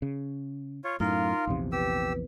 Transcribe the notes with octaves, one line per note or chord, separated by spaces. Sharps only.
C#3
F4 C#5
F#2 A2 D#4 F4 A#4 F5 C6
A#1 E2 C3
G4 B4 E6